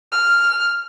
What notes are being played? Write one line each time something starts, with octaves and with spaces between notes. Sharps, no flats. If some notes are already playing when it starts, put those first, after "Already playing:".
F6